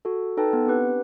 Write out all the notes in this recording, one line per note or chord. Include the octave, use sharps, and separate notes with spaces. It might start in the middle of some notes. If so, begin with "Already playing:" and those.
F#4 A4
D#4 A4 B4 G5 A5
B3
C4 D4 G4 B4 F#5